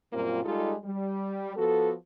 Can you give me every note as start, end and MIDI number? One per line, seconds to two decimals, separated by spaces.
0.13 0.44 42
0.13 0.44 46
0.13 0.44 55
0.13 0.44 58
0.13 0.44 60
0.13 0.44 65
0.45 0.74 55
0.45 0.74 56
0.45 0.74 63
0.45 0.74 65
0.45 0.74 67
0.45 0.74 69
0.84 1.56 55
1.57 1.92 53
1.57 1.92 59
1.57 1.92 66
1.57 1.92 69